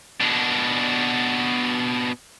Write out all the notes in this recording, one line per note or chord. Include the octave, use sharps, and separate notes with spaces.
B2 D4